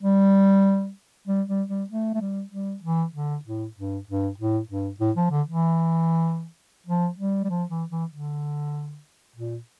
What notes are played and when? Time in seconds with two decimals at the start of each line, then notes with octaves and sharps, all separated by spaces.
0.03 G3
1.28 G3
1.49 G3
1.69 G3
1.90 A3
2.15 A3
2.21 G3
2.52 G3
2.83 E3
3.15 D3
3.45 A2
3.77 G2
4.08 G2
4.38 A2
4.69 G2
5.00 A2
5.17 F3
5.31 D3
5.48 E3
6.87 F3
7.18 G3
7.44 G3
7.50 F3
7.70 E3
7.90 E3
8.12 D3
9.36 A#2